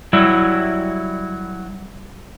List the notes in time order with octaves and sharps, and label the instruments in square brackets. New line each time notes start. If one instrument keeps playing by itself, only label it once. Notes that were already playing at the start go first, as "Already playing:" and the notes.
[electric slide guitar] F#3 G3 E4